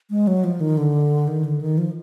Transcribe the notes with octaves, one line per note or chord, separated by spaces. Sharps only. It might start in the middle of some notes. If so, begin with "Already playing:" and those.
G#3
F#3
F3
D#3
D3
D#3
D3
D#3
F3